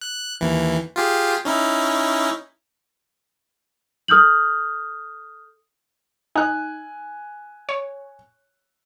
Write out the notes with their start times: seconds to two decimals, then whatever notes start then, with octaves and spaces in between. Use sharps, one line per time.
0.01 F#6
0.41 D#2 E3
0.96 F4 G4 G#4
1.45 C#4 D#4 E4
4.08 A4 D#6 F6 G6 F#7
6.36 D#4 G#5 F#6
7.69 C#5